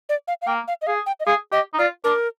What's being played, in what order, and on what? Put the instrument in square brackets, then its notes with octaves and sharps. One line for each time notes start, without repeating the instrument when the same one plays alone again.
[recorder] D5
F5
F5
[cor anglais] A#3 [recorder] G5
[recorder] F5
D#5
[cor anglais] G#4 [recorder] F5
[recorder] G5
D#5
[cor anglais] G#4 [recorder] F5
[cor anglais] G4 [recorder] D#5
[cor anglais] D#4
[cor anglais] F4 [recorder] D5
[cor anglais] D4 [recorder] A#4